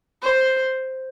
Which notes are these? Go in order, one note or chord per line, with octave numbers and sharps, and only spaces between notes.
C5